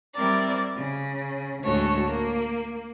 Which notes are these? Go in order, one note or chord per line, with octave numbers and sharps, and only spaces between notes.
G3 C4 E4 A#4 D5
C#3
D2 A2 G#3 F#4 A4 C#5
A#3